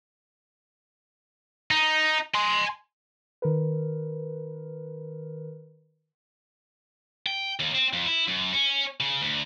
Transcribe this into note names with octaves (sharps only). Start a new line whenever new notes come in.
D#4
G#5 C6
D#3 A#4 B4
G5
D#2
C4
F2
E4
F#2
C#4
C#3
D2